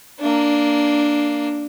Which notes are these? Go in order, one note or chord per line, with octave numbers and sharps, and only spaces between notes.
A#3 D4